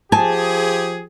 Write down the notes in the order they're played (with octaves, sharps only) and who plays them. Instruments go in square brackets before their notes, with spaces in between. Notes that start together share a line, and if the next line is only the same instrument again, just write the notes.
[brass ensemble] F3 G4 G#4 [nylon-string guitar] G#5 A5